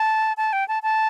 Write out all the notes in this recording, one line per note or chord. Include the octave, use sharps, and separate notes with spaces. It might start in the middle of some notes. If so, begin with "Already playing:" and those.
Already playing: A5
A5
G5
A5
A5